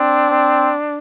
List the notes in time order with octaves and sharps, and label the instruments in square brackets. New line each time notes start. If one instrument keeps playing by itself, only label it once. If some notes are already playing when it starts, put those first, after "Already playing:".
Already playing: [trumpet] C4 [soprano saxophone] D4
[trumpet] C4